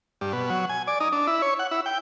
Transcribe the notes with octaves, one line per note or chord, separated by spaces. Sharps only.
G2
B2
F#3
G#5
D5
D#4
D4
E4
C#5
F#5
E4
G5